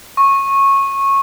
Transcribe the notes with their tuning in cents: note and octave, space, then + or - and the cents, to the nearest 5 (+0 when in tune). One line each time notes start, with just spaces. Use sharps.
C#6 -15